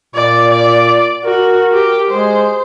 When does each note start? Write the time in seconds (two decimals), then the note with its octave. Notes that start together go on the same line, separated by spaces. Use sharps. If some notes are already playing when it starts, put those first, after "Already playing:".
0.15 A#2 D5
0.51 D5
1.25 F#4 A#4
1.73 G4
2.11 G#3 C5